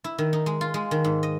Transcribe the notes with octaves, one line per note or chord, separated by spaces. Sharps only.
E4
D#3
D#4
G#3
F4
G#3
D#3
G#2
D#5